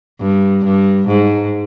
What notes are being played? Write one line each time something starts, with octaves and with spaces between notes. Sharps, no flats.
G2
G2
G#2